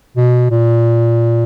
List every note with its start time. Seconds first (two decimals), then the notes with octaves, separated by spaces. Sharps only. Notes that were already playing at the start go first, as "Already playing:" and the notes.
0.16 B2
0.51 A#2